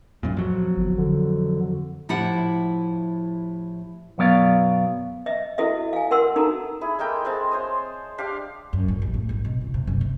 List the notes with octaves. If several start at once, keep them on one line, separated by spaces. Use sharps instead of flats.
D#1 F#2 A#2
F2 F#3
G1
D3
A2 F3 E4 G4 F#5
B1 F#2 F#3 B3 D5 F5
D#5 E5
E4 F#4 A4 D#5 E5
F5 G#5
A#4 F#5 C6 E6
D#4 F#4 A4 A#5
E4 G#4
G#3 A#3 A4 G5
G#3 C4 A5
C5 C#5 D#6
D4 G4 F5
F#2
A2
A1
A2
G#1
B2
C#2
C3
F#1
C3